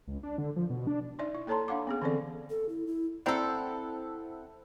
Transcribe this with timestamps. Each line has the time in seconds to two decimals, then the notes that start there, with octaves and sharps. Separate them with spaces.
0.08 C#2
0.23 D4
0.38 D3
0.56 F3
0.70 B2
0.87 D4
1.19 D#4 D5 E5
1.35 E4
1.47 A#3 A4 C#5 A5 A#5 C6
1.68 D4 F5 F#5 D6
1.87 B3 C#4 G#4
2.02 D3 E3 C4 C#4 A4 D5
2.50 A4
2.69 E4
2.87 E4
3.26 C4 E4 A4 C5 D5 F#5 G5 A#5